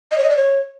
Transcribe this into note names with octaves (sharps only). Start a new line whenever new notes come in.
D#5
C#5
D#5
D5
C#5